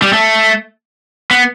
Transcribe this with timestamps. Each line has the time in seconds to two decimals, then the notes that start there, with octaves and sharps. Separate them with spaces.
0.02 G3
0.13 A3
1.31 B3